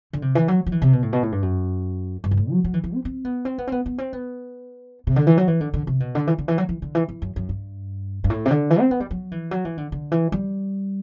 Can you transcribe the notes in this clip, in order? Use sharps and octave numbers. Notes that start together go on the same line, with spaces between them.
D3
C3
E3
F#3
F#3
E3
C3
B2
A2
B2
A2
G2
F#2
G2
B2
A2
F#3
F#3
E3
E3
C4
C4
B3
C4
B3
C4
B3
B3
C4
B3
C3
D3
E3
F#3
E3
D3
D3
C3
B2
D3
E3
D3
E3
F#3
E3
D3
E3
E3
F#2
F#2
G2
G2
A2
C3
D3
E3
C4
B3
G3
F#3
E3
F#3
E3
D3
D3
E3
G3